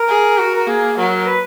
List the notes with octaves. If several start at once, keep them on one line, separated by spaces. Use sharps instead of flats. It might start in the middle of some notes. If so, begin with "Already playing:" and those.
Already playing: A#4
G#4
F#4
A#4
A#3 G#4
F#3 A#4
A#4
B4